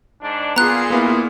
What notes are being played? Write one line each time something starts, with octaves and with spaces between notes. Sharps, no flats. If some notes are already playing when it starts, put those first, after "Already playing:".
G#2 D4
A#2 B3 F4 G#4 A#5 F#6
A#3 B3 E4